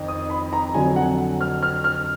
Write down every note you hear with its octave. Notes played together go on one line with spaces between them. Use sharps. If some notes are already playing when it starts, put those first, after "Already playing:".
Already playing: F2 D#3
D#6
B5
A#5
F2 D3 F#3 G#5
F#5
F6
F6
F6